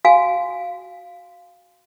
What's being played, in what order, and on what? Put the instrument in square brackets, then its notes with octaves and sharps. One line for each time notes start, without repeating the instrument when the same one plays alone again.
[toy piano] F#4 F5 G#5